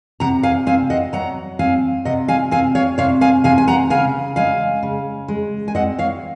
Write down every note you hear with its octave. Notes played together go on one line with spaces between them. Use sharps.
C3 F#5 A#5
F5 G#5
C4 F5 G#5
D#5 F#5
F#3 F#5 A#5
C4 F5 G#5
C3 D#5 F#5
F5 G#5
C4 F5 G#5
C#5 F5
C3 C#5 F5
F5 G#5
C3 F5 G#5
G#5
F#5 A#5
C#3 F5 G#5
G#3 F5 G#5
C#3
G#3
G#5
C4 D#5 F#5
C#5 F5